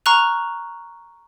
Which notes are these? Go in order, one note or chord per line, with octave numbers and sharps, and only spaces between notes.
A#5 C#6 F6 F#6 F7